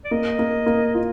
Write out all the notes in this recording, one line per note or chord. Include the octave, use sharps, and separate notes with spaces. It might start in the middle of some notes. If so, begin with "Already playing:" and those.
D5
A#3 D#5
A#3
A#3
F4